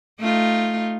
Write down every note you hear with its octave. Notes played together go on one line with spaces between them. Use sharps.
A3 D#4 F4